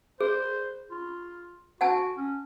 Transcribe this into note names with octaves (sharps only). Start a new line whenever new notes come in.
G#4 C5
F4
F#4 F#5 G#5 A5
C#4